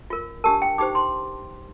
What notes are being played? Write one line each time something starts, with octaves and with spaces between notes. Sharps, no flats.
F4 A#4
D4 G4 A#4 A5
G5
D#4 G4 C5 D6
C6